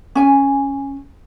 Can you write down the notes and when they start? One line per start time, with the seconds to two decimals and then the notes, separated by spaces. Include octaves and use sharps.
0.15 C#4 G#5